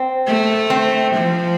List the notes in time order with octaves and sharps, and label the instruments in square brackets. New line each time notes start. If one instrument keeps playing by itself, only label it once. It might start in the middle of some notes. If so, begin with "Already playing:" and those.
Already playing: [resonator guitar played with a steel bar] C4
[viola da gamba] A3
[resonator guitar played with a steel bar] C4
[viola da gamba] F3